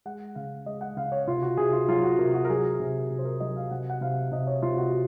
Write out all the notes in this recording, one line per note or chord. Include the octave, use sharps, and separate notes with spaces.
G#3 F#5
C#3 F5
G#3 D#5
F#5
C#3 F5
C#5
C3 F4
F#4
C3 G#4
F4
F#3 F4
F#4
C3 A#4
F#4
A#4
F#3 G#4
C3
C3
C5
A#4
F#3 D#5
F5
C3 F#5
F#5
C3 F5
C3 D#5
C#5
C3 F4
F#4